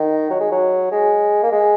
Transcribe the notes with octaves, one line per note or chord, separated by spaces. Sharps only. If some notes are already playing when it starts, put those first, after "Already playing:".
Already playing: D#3
F#3
G#3
F#3
G#3
A#3
G#3